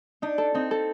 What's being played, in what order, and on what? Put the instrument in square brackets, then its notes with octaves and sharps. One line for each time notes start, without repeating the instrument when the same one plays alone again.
[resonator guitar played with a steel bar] D4 [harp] D#4
[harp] A4
[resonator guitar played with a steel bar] C4 [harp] D#4
[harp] A4